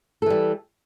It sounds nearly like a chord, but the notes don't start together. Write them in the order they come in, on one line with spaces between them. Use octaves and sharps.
A4 E3 G3